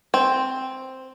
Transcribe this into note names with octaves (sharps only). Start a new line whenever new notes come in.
C4